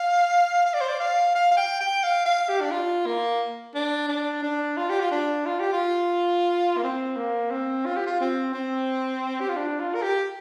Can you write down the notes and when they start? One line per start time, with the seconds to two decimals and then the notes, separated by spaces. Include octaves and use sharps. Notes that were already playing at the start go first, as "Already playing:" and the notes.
Already playing: F5
0.66 F5
0.74 D5
0.81 C5
0.89 D5
1.00 F5
1.35 F5
1.51 F5
1.57 G5
1.81 G5
2.04 F5
2.26 F5
2.49 G4
2.61 D4
2.72 F4
3.06 A#3
3.75 D4
4.08 D4
4.43 D4
4.77 F4
4.90 G4
5.01 F4
5.11 D4
5.46 F4
5.60 G4
5.73 F4
6.78 A#3
6.83 C4
7.17 A#3
7.51 C4
7.86 F4
7.97 G4
8.07 F4
8.21 C4
8.54 C4
9.41 G4
9.49 F4
9.57 D4
9.80 F4
9.95 A#4
10.02 G4